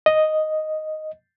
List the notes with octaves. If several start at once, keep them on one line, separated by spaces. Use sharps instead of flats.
D#5